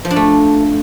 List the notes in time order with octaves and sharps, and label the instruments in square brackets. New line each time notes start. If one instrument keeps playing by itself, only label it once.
[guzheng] F3
D4
A3